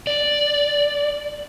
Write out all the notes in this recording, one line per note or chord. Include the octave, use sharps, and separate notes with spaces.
D5